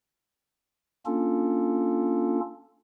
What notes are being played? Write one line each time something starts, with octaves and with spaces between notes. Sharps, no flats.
A#3 C#4 D4 F4 A4